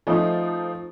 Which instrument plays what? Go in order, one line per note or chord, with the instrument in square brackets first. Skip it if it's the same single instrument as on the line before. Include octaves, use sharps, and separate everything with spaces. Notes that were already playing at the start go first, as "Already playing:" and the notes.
[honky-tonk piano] F3 A3 C4 D#4